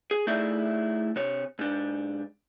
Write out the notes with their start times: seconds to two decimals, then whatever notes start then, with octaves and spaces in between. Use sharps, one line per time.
0.11 G#4
0.27 A3 D#4 E4 G#4 D5 E5
1.16 C3 C#5
1.59 G#2 D4